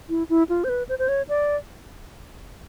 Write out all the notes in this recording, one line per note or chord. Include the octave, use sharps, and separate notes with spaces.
E4
E4
F4
C5
B4
C5
C5
C#5
D5